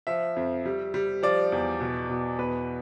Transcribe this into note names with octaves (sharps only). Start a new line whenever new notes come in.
F3 E5
F2
G3
G3
F3 D5
E2
B2
B2
E2 B4